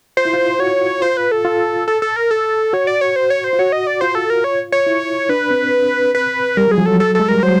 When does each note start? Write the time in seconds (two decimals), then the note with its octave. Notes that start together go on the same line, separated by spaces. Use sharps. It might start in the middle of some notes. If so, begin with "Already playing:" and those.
0.17 F4 C5
0.25 E4
0.34 F4
0.59 F#4 C#5
1.02 F4 C5
1.17 B4
1.32 A4
1.45 F4
1.88 A4
2.02 A4
2.16 A#4
2.31 A4
2.73 F#4 C#5
2.87 D5
3.01 C#5
3.16 C5
3.30 C#5
3.44 C5
3.53 F4
3.59 F#4 C#5
3.72 D#5
3.87 D5
4.01 F4 C5
4.15 A4
4.30 A#4
4.44 C#5
4.72 C#5
4.87 E4
5.29 D4 B4
5.51 C4
6.15 B4
6.57 G3 A#4
6.67 F#3 G#4
6.78 F3
6.86 F#3 A4
7.00 A4
7.15 G#3 A4
7.28 G3 A#4
7.43 F#3 C5